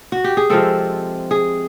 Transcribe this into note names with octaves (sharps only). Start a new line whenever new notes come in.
F#4
G4
G#4
C3 F3 G#3 C4 A4
G#4